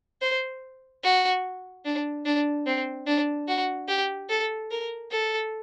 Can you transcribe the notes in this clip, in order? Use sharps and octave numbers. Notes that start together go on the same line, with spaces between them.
C5
F#4
D4
D4
C4
D4
F#4
G4
A4
A#4
A4